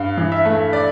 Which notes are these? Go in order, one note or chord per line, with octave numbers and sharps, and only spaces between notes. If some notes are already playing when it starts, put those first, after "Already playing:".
Already playing: G2 F5
E3
E5
A3
D5